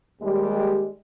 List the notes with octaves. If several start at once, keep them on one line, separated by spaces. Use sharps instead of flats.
D#2 G3 G#3 G4